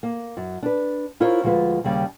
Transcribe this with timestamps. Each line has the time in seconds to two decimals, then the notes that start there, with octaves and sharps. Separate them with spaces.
0.03 A#3
0.37 F#2
0.63 D4 B4
1.20 E4 F4 A#4 C5 C#5
1.44 D2 F3 G#3 F4 B4
1.84 D#2 C#3 G3